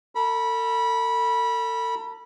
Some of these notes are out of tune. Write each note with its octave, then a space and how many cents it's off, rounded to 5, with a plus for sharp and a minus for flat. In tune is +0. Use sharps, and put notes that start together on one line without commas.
A4 +40 B5 -20